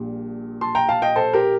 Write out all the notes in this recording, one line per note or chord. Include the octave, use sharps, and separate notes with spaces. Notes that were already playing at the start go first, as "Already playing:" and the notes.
Already playing: A#1 A#2 G3
A5 C6
G5 A#5
F5 A5
D#5 G5
A4 C5
G4 A#4